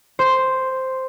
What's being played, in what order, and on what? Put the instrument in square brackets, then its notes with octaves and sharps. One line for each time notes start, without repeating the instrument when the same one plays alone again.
[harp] C5